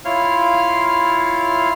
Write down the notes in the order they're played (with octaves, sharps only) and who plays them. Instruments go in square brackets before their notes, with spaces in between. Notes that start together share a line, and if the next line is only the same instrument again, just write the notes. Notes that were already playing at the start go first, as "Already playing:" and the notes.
[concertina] E4 F4 C#5 F5 F6